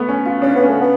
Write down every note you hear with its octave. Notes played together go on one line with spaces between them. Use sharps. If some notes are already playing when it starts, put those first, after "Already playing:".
Already playing: A3 B3
C#4
F4
C#4 D4
B3
A3 C#4
B3